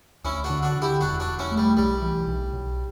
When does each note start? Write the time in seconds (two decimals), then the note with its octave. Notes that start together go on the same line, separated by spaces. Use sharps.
0.24 D2 C#4 E4
0.44 D4 F#4
0.50 D3
0.63 D4 F#4
0.76 D3
0.82 E4 G4
1.01 E1 D4 F#4
1.20 D4 F#4
1.26 E1
1.39 C#4 E4
1.51 A3
1.58 G3
1.77 B1 G3
2.02 E3
2.27 B1
2.53 B1